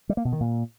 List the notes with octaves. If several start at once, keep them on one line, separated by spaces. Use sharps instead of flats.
G3
A#3
B2
D#3
A#2